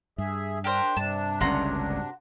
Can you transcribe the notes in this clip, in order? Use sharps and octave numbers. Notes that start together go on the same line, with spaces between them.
G2 G#4 E5
D4 G4 A#4 C5
G2 C3 D4 A5
G1 C#2 C#4 F#4 A#5 C6